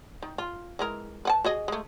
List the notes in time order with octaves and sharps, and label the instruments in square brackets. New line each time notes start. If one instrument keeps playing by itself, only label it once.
[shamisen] D#3
F4
E3 G#3 A#4
B4 F#5 A5
F#4 G#4 D#5
G#3 A3